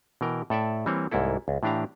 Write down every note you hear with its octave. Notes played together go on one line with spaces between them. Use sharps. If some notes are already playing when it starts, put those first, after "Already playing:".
B2 E3 A#4 G5
A2 A4 D5 E5
E3 G3 A#3 C4 C#5
C2 G#2 A#3 E4 A4
C#2
A2 E3 D4 G4 F5 A#5